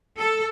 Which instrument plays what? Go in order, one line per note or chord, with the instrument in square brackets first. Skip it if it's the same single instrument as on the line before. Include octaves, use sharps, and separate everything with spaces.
[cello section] A4